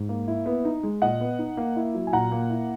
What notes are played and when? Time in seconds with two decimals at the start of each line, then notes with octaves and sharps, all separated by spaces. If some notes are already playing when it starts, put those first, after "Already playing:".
Already playing: G#2
0.09 A#3
0.28 E4
0.46 B3
0.65 D#4
0.83 G#3
1.02 A#2 D#5 F#5
1.20 B3
1.39 D#4
1.57 A#3
1.76 E4
1.95 F#3
2.07 G#5
2.13 A#2 F#5 A#5
2.32 A#3
2.50 E4